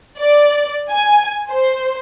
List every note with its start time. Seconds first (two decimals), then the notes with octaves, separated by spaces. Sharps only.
0.19 D5
0.90 G#5
1.50 C5